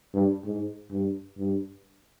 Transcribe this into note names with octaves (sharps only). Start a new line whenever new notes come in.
G2
G#2
G2
G2